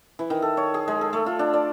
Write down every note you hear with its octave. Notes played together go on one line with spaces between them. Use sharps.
E3
D#3
A4
C#5
G#4
G#3
A4
A3
F4
D4
D5